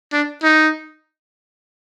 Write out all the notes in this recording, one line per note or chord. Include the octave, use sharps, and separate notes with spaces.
D4
D#4